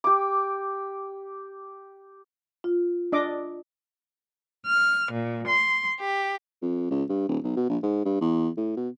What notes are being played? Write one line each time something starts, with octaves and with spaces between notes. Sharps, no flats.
G4 D6
F4
D4 D#5 D6
F6
A#2
C6
G4
F2
C#2
G2
D#1
B1
B2
A#1
G#2
G2
E2
A2
B2